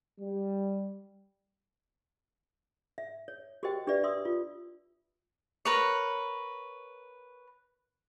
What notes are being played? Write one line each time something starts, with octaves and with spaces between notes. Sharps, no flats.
G3
E5
C#5
F#4 G4 A#4 C5 D#5 G5
D4 G4 B4 D5 E5
D5 E5 C6 D#6 E6
F4
A#4 B4 C#5